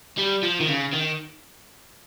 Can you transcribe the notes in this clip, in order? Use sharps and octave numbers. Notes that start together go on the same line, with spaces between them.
G3
F3
D#3
C#3
D#3